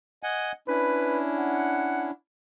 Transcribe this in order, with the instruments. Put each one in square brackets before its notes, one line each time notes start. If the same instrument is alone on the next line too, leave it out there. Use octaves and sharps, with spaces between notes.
[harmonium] D#5 F#5 G#5
[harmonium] C#4 D4 E4 [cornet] B4
[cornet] F#5